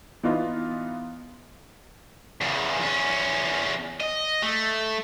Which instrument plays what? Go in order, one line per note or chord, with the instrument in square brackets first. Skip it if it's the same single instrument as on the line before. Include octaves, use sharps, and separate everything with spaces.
[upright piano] E3 B3 D#4 F4
[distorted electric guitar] E2 C#3
E2 C#4
D#5
A3